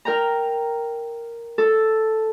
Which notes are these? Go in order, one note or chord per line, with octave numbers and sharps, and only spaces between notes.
A#4 G5 A#5
A4